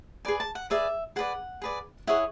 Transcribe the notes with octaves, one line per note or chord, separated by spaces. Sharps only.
G#4 B4 D5 G#5
A5
F#5
G#4 B4 D5 E5
G#4 B4 D5 F#5
G#4 B4 D5
E4 G#4 C#5 F#5